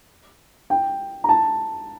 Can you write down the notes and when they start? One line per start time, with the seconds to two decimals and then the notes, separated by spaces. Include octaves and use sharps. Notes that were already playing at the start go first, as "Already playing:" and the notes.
0.70 G5
1.24 A#5
1.29 A5